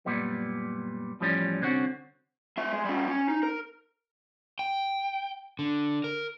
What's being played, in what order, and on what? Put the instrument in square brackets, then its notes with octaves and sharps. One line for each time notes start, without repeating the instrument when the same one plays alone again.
[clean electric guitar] F#2 A#2 G3 B3
E2 A2 F3 G3 C#4
C2 D3 C4 C#4 F#4
[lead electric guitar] G#3 E5
G#3
G3 C#4
C#4
D#4
A#4
[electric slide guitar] G5
D3
A#4